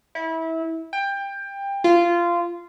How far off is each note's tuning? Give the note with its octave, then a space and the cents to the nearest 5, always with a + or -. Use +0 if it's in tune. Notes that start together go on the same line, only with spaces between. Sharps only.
E4 -25
G5 +20
F4 -15